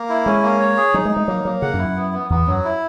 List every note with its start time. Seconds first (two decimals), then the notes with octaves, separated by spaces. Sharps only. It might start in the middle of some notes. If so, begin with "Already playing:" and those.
Already playing: A#3
0.09 E4
0.25 G#3 C#4
0.43 A#3
0.59 C#5
0.77 G#4
0.93 F#3 D#4
1.05 G#3
1.11 D#4
1.16 G#3
1.27 F#3 A#3
1.44 F#3 A#3
1.62 C#3 F#5
1.74 F#2
1.79 E4
1.84 F#2
1.96 B3
2.13 B3
2.30 E2 B3
2.47 F#2 F#3
2.64 E4